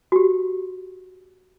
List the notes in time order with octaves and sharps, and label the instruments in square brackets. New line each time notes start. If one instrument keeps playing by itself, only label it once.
[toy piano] F#4 G4